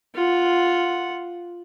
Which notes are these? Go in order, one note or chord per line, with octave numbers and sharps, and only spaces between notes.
F4 F#5